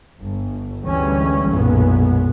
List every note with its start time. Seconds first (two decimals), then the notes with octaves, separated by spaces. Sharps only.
0.21 G1
0.83 D2 E3 G3 G#3 C#4
1.50 B1 F#2 A#2 G#3 B3